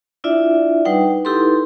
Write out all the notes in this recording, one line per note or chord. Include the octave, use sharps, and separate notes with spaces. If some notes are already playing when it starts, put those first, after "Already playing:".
D4 E4 F4 D5 E5
G3 D#4 B4 F#5 G5
D#4 E4 G4 A4 B4 C6